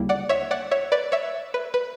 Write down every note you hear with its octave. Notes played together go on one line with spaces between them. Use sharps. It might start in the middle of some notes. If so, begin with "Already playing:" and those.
Already playing: D2 C#3 G3 A#3 E4
D5 F#5
C#5 E5
D5 F#5
C#5 E5
B4 D5
C#5 E5
B4
B4